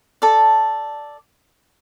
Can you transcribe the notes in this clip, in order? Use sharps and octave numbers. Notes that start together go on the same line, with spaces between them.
A4 D5